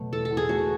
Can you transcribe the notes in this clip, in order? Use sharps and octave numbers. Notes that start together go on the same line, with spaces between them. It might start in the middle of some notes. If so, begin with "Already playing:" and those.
Already playing: B2 F#3 A3
E2 A4
A4
E2
G#4
A3 F#4